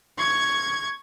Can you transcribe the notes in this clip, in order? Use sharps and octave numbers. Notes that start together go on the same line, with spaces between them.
C#6 G#6